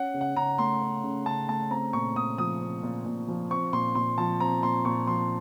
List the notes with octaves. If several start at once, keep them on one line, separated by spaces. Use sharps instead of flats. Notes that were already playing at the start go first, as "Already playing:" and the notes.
Already playing: C#4 F#5
C#3
F#5
C#3 A#5
A3 C6
C#4
C#3
C#3 A5
A3 A5
C4 A#5
A#2 C#6
A#2 D#6
F3 D#6
C4
A#2
A#2
F3
C4 C#6
A#2 C6
A#2 C6
F3 A5
C4 A#5
A#2 C6
A#2 C#6
F3 C6